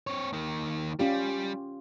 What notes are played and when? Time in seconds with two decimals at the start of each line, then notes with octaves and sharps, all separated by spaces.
0.07 C4 C#5
0.33 D#3 A#3
0.99 G3 C#4 F4 G4